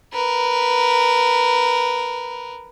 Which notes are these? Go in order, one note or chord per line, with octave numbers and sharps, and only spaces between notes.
A#4 B4